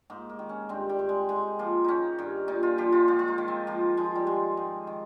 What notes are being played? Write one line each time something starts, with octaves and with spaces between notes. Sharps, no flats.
G#2 A#3
A#3
D#3
C#4
G2 C4
G3
G2
G#3
G#2 G#3
F3 A#3
D#3 C#4 D#4
G2
A#2 D#4
F4
F3 G4
F4
G#2 F4
F4
D#4
D#3
C4
F3 A#3
F3 G#3
G3
D#3 G#3
G#2
D#3